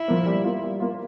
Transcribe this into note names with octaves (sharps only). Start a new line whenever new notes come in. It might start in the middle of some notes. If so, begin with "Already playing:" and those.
Already playing: E4
F3 A#3
G3
A#3 F4
G3
A#3 F4